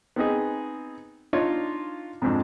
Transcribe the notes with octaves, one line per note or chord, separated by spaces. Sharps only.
B3 C4 D#4 G#4
D4 D#4 F4 C#5
F2 G#2 F3 C4 D4